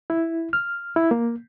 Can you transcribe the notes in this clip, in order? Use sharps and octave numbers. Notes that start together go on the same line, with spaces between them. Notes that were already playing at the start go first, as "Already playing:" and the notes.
E4
F6
E4
A#3